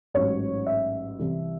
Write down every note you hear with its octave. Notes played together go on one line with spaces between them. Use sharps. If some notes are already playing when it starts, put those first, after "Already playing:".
A1 G#2 F#3 C#5
E5
C2 C3 E3